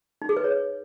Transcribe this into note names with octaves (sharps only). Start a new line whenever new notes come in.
D#4
G#4
B4
C#5